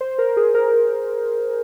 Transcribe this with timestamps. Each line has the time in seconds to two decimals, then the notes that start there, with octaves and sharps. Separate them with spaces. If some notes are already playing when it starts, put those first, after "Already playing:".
0.01 C5
0.18 A#4
0.37 G#4
0.55 A#4